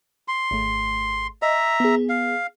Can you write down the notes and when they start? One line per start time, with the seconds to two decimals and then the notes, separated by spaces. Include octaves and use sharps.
0.28 C6
0.51 G#1 A3
1.42 D#5 E5 A#5
1.80 B3 G#4
2.09 F5